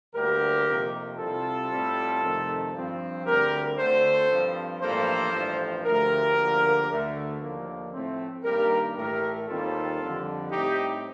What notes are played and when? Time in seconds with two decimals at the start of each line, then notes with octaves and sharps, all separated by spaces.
0.14 D2 D3 G3 A#3 G4 A#4
0.66 F2 C3 D#3 A#3
1.18 C2 C3 G3 C4 F4 A4
1.70 A2 G3 C4
2.22 F2 C3 D#3 A3 C4
2.73 G2 F3 C4
3.25 D2 D3 G3 C4 G4 A#4
3.77 D2 D3 A3 C4 A4 C5
4.30 G2 F3 C4
4.81 A1 G2 F3 A#3 A4 C5
5.33 A1 G2 F3
5.85 D2 D3 F3 A3 G4 A#4
6.37 D2 D3 F3 A#3
6.89 D2 D3 A3
7.40 D#2 D3 F3 A#3
7.92 A2 F3 A3 C4
8.44 G2 D#3 G3 A#3 G4 A#4
8.96 A1 A2 A3 G4 A#4
9.48 D#2 D#3 G3 C4 F4 A4
9.99 F2 D3 G3
10.51 A2 G3 C4 D#4 G4